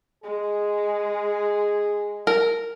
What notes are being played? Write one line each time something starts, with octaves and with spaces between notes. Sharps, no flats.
G#3 G#4
A#4